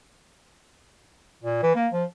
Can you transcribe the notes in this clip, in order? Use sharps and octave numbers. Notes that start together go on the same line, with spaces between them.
A#2
E3
A#3
F3